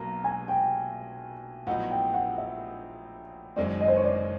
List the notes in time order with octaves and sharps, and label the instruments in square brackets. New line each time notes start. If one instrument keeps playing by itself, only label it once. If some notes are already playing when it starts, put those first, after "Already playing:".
Already playing: [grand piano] B1 B2 F#3 A#3 [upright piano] A#5
[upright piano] G#5
G5
[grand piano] A#1 A2 F#3 B3 D#4 [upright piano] F#5
[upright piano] G5
F#5
E5
[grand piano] F#1 F#2 D#3 G#3 C4 [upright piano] D5
[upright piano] D#5
C5
C#5
D5